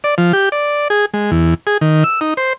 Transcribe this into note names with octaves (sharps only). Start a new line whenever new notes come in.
D5
F3
G4
D5
G#4
G#3
E2
G#4
D#3
E6
D#4
C5